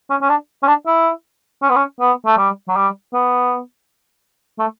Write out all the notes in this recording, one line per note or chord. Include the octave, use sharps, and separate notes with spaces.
C#4
C#4
D4
C#4
D4
E4
C#4
B3
C#4
B3
A3
G3
F#3
G3
B3
A3